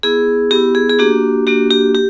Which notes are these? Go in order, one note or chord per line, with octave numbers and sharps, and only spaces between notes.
B3 E4 G#4
B3 E4 G4
G#4
G#4
A#3 D4 F#4 G4
A#3 D4 F#4 G4
G4
G4